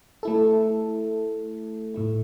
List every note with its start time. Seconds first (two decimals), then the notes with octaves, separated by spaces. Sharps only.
0.23 A3 E4 A4
1.94 A2 A3 E4